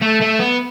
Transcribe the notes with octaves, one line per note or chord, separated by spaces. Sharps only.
A3
A3
B3